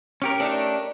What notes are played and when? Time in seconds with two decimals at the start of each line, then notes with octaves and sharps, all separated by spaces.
0.22 C#4 G4 A#4
0.40 A3 D4 D#4